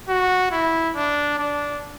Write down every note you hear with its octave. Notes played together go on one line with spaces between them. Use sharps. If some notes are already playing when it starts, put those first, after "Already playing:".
F#4
E4
D4
D4